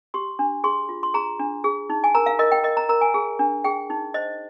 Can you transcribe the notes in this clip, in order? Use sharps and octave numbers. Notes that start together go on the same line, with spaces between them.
G4 C6
D4
G#4 C6
F4
C6
G#4 A#5
D4
G#4
D#4
G#5
A#4 A#5
F5
A#4 D#5
G5
A#4 D#5
A#5
A#4 A#5
G#5
G#4
D4
G#4 G5
D#4
C5 D#5